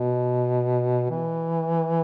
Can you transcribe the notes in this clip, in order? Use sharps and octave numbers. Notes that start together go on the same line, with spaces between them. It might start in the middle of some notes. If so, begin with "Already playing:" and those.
Already playing: B2
E3